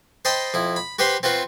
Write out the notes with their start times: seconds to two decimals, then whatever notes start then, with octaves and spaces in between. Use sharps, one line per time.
0.25 C5 D#5 G5 A5 B5 C6
0.54 F2 E4
0.76 B5
0.99 F#4 G4 B4 C5 B5 C6
1.23 C4 F4 F#4 B4